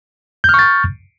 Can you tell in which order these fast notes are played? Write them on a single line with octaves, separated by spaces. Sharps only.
G6 F6 C#6 A6